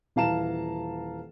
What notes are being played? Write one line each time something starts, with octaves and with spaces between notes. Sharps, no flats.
D#1 E3 F5 A5 A#5 E7